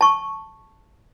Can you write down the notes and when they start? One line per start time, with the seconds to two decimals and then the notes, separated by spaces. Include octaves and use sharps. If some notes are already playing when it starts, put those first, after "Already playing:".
0.01 A5 C#6